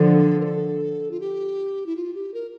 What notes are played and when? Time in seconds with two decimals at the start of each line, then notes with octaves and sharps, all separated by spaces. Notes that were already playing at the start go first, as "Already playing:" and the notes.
Already playing: D3 F3 A4
0.40 A#4
0.45 A4
1.11 F4
1.20 G4
1.86 E4
1.96 F4
2.15 G4
2.34 A#4